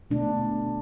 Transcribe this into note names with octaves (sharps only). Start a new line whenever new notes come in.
B2 A3 D4